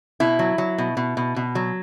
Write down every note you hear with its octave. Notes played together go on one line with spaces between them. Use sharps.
B2 E4
F#3
F#3
B2
B2
B2
B2
F#3